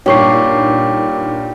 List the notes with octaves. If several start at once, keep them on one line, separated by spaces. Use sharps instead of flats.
G2 A#2 D#4 G4 C#5 C#6 C7